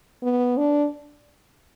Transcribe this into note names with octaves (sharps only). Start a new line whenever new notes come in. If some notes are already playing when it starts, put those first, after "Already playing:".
B3
D4